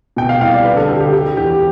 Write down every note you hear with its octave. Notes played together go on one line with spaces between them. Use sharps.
B2 G5
F5
C2 F5
D5
D3 B4
A4
D2 G4
G4
D3 G4
E2 G4